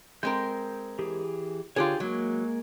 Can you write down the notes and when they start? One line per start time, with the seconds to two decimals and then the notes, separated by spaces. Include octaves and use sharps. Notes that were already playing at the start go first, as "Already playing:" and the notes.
0.23 G#3 C4 A#4 G6
0.99 E3 G4 G#4
1.76 D3 F4 G4 G#4 B4 C#5
2.00 F#3 G#3 A#3